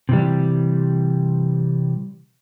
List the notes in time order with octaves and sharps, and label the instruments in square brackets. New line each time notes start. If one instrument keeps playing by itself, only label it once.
[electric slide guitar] C3 E3 G3